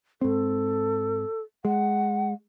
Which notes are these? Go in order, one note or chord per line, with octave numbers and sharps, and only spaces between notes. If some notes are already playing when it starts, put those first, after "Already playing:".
G#2 C4 A4
G#3 F#5